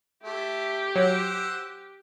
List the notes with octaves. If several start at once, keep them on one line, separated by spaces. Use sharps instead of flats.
A3 E4 G4
F#3 C5 F#5 E6